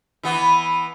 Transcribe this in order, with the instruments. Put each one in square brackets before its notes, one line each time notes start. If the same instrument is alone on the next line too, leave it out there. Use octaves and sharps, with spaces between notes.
[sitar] E3 B3